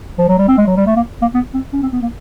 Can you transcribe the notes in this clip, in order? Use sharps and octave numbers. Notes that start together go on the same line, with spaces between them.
F3
F#3
G3
C4
G#3
F#3
G3
A3
A#3
A#3
B3
C4
C#4
C4
B3
A#3